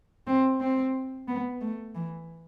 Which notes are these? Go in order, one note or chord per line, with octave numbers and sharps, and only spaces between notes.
C4
C4
B3
A3
E3